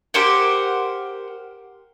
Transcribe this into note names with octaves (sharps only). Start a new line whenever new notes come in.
G4 A#4 C5 F#5